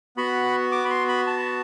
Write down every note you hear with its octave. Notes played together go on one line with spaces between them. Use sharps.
B3 F#4 B5
D6
B5
C6
B5
A5